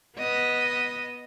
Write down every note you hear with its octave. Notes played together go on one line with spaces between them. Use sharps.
B3 D#5